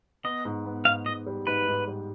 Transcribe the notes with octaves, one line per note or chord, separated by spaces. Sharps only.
B3 D#5
G#2
B3
G#2 F5
G#2 D#5
G3
G#2 B4
G#2
G3